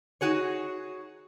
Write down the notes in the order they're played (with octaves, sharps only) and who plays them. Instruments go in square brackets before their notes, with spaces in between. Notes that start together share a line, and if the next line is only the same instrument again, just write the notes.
[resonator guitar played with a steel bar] D#4 F#4 G#4 C#5